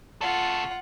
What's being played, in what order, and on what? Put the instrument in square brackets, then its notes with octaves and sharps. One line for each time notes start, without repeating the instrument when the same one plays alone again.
[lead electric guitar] C#3 A4 [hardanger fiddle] F4 F#5